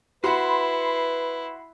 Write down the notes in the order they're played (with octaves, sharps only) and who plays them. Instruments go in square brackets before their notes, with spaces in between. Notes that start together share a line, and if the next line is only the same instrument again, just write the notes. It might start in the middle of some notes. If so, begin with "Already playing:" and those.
[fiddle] E4 [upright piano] F#4 F#5 [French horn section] B4 [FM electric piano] B5 C6 C7